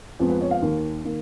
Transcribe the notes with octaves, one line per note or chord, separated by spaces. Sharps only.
F2 F3 G#3 B3
B4
C#5
F5
D#2 D#3 A#3
D#3 A#3